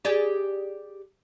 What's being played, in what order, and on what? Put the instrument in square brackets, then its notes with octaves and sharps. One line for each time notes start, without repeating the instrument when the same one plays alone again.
[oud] G4 G#4 D5